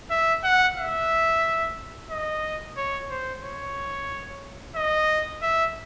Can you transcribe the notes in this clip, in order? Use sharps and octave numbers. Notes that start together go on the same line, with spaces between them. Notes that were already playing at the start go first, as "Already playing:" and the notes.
E5
F#5
E5
D#5
C#5
C5
C#5
D#5
E5